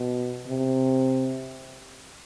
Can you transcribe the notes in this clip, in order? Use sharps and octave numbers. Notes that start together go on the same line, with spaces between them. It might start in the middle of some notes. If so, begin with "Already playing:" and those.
Already playing: B2
C3